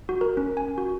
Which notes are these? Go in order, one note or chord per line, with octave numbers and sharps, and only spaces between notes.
F#4
A#4
C#4
G#5
F#4